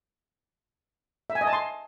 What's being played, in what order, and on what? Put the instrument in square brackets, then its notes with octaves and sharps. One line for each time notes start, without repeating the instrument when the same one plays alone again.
[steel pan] E5
G#5
D#5
A5
C6